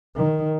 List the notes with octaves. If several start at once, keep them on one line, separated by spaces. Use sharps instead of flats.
D#3